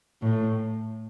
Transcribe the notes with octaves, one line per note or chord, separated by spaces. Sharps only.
A2